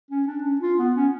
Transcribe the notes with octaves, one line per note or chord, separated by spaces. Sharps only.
C#4
D4
C#4
F4
B3
C#4